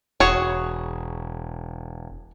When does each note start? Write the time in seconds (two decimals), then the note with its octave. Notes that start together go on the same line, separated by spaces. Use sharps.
0.20 E1 F#4 G#4 C#5